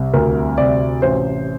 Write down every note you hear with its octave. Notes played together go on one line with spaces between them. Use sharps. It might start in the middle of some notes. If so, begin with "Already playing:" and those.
Already playing: C2 C3
D2 A#4
C3 D5
A1 C5